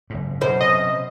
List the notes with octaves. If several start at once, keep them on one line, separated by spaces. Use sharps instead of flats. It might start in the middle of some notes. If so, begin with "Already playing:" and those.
F#1 G#2
F#2 B2 C5
C3 D#5